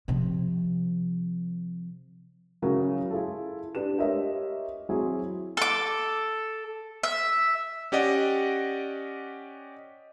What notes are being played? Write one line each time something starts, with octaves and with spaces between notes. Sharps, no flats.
C3 F3
C#3 F#3 E4 A#4
E4 F4 G#4 A4
D4 G4 B4 E7
F4 G4 A#4 C#5 D#5 E5
F#3 C4 E4 G#4
A4 D6
E5
C#4 G4 D5 D#5 F#5